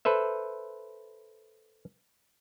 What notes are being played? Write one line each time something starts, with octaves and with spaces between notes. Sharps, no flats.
A4 B4 C5 E5